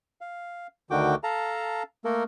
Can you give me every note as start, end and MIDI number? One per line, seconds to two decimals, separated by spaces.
0.21 0.67 77
0.90 1.15 38
0.90 1.15 50
0.90 1.15 51
0.90 1.15 66
0.90 1.15 79
0.90 1.15 86
1.23 1.83 69
1.23 1.83 77
1.23 1.83 81
1.23 1.83 82
2.05 2.23 57
2.05 2.23 58
2.05 2.23 69
2.05 2.23 70